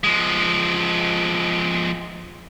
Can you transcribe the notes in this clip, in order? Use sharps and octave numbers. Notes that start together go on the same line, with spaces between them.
F3 G#3